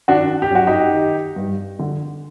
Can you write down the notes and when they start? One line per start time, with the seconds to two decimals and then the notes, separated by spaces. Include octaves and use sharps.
0.08 D#3 D4 F#4
0.42 G4
0.51 F#2 F#4
0.67 D#4 G4
0.94 D#3
1.36 G2
1.79 D3